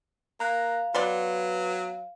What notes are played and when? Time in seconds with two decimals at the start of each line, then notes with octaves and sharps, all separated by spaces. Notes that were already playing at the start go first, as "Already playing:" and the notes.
0.40 A#3 F5 A#5 F#6
0.95 F#3 B3 B4 D5 C6